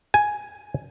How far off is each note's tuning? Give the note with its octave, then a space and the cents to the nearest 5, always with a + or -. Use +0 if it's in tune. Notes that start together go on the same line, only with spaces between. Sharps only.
G#5 +5